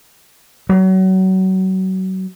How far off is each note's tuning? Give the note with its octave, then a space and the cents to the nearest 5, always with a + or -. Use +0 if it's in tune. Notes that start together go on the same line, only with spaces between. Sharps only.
F#3 +30